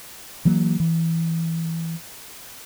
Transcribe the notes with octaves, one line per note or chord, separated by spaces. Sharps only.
E3 F#3 A#3
E3